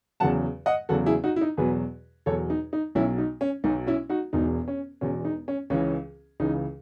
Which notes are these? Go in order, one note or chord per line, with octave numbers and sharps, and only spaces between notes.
E2 C#3 F#3 F#5 A5
D#5 F#5
E2 C#3 F#3 F#4 A4
E4 G#4
D#4 F#4
E4
D#4
E2 B2 F#3 G#4 B4
E2 B2 F#3 A4 C#5
D#4
D#4
B1 B2 F#3 C#4 E4
D#4
C#4
B1 B2 F#3 D#4
C#4 E4
D#4 F#4
E1 E2 B2 D#4
C#4
E1 E2 B2 C#4
D#4
C#4
C#2 C#3 E3 C#4
C#2 C#3 E3 D#4